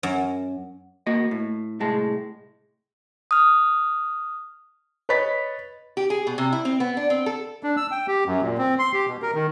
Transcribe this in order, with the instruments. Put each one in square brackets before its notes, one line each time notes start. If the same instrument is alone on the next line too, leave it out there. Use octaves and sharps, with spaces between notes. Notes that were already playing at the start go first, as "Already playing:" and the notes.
[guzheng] F#2
[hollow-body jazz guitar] A#3 F#4 D#5
A2
C2 A2 G#3 A5
[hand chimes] D#6 F6
[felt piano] B4 C#5 D#5 B5 A6 B6
[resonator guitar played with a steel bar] G4
G#4
B2
C3
E4
C4
B3
D4
C4
A4
[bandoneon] D4
E6
G5
G4
F#2
A#2
C4
C6
G4
B2
A#4
D#3